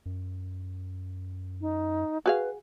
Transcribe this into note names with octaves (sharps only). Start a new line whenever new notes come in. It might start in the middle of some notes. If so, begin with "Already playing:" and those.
F#2
D#4
F#4 G#4 B4 F5